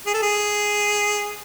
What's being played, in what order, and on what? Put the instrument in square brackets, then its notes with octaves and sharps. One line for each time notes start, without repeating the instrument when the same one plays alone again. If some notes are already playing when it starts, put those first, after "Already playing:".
[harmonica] G#4
A4
G#4